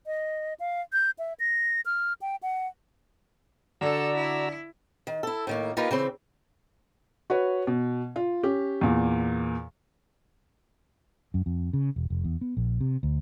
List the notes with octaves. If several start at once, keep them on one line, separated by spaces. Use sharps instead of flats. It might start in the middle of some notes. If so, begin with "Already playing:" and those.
D#5
F5
G6
E5
A#6
F6
G5
F#5
D3 F#4 A4 D5 A#5 E6
E4
D#3
E4 A4
A2 D#3 A#3
A#3 D#4 F4 G4 A#4 B4
C#3 E3 C4
F#4 B4 C#5
B2
F4
C#4 G4
E2 A#2
F#2
F2
C#3
E1
F1
E2
B3
A#1
C3
D2